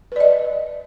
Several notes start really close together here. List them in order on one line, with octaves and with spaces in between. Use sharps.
B4 D5 D#5